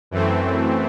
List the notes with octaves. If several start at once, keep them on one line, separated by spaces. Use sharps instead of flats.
F#2 E3 A3 C4